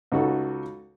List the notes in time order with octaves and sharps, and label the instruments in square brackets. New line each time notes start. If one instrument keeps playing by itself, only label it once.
[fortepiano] C#2 D#4 F#4 A4